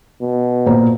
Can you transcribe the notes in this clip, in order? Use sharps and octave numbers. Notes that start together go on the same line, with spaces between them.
B2
A#2 C5 A#5